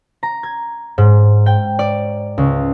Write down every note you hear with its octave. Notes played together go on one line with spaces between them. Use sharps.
A#5
G#6
G#2
G5
D5
C#2